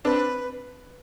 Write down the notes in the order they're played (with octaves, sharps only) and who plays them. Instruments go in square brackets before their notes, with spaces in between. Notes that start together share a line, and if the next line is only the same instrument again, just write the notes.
[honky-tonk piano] C4 D4 [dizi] B4